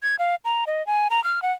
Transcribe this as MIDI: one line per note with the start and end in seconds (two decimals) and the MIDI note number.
0.03 0.16 92
0.19 0.35 77
0.45 0.64 82
0.67 0.85 75
0.87 1.08 80
1.10 1.23 82
1.24 1.42 89
1.42 1.52 78